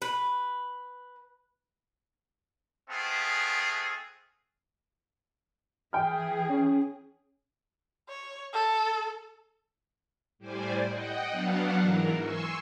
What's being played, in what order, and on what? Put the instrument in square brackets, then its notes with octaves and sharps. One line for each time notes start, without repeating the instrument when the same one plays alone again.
[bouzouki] B4
[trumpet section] A3 B3 C4 F4 G#4
[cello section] E3 G#4 [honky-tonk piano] G5 F6
[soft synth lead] C#4
[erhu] C#5
A4
[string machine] A2 G3 C5 D5 G#5
D#5 F#5 G5
F#3 B3 D4 F5 F#5
G#2 E3 A#4
G#5 C6 C#6 E6